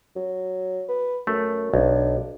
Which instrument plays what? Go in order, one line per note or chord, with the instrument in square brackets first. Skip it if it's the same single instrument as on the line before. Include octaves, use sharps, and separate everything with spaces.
[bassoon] F#3
B4
[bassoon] F#2 [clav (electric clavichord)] A3
[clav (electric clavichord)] B1 [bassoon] D4